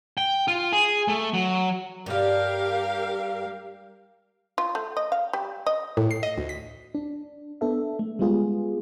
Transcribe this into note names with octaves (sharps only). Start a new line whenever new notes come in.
G5
F4
G#4
A3
F#3
G2 G3 G4 A#4 F5
F4
A3
D#5
F5
G3
D#5
A2
C7
D#5
D2
B6
D4
B3 D4 A4 E5
A3
G3 G#3 B3 F4 G#4